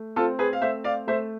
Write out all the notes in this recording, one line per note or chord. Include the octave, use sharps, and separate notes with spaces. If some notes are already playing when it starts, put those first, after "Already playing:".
Already playing: A3
C4 F4 A4
G#4 B4
F5
A3 C5 E5
D5 F5
A3 C5 E5